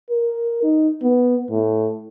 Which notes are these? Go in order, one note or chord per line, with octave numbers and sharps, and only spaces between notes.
A#4
D#4
B3
A2